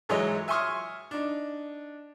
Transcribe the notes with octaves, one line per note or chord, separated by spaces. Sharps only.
G#2 E3 F#3 G#3 C#5 D#5
E5 G#5 C6 C#6 D#6 F6
D4 D#4